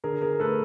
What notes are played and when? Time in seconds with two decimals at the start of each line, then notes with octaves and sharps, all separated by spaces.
0.04 D3 G#4 A#4
0.22 G#4 A#4
0.40 A3 A4 B4